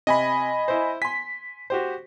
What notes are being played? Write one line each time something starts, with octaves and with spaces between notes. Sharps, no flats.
C3 D#5 G#5 B5
E4 C5
G#5 C6 B6
F#4 G4 C5